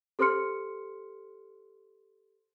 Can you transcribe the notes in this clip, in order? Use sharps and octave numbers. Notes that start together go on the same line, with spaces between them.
G4 A4 C5 C6 F6 C#7